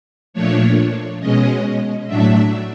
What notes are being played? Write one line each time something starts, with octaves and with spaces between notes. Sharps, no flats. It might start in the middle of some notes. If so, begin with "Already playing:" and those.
A#2 F3 A3 D4 C#5
B2 G#3 C#4 D#5
A2 F#3 A3 D4 E5